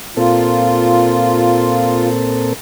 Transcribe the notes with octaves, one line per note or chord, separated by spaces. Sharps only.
A#2 C4 F4 A4